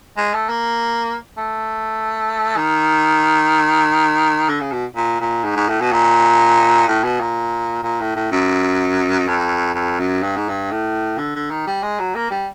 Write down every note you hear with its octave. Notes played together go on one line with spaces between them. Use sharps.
G#3
A3
A#3
A3
D#3
D3
C#3
B2
A#2
A#2
G#2
G#2
A2
B2
A#2
A2
B2
A#2
A#2
A2
A2
F#2
F2
F2
F#2
G2
G#2
G2
A2
D3
D3
D#3
G3
G#3
F#3
A#3
G3